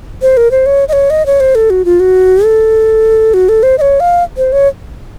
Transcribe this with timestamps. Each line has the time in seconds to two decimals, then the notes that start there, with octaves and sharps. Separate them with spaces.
0.22 C5
0.37 A#4
0.51 C5
0.66 C#5
0.88 D#5
0.93 C#5
1.10 D#5
1.26 C#5
1.40 C5
1.55 A4
1.70 F#4
1.85 F4
2.00 F#4
2.44 A4
3.34 F#4
3.49 A4
3.63 C5
3.78 D#5
3.81 C#5
4.00 F5
4.37 C5
4.52 C#5